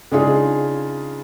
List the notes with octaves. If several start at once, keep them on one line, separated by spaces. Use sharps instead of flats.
C#3 G#3 D4 D#4 F4 G#4